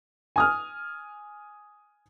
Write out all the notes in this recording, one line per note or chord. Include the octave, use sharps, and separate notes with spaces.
G#5 D#6 F6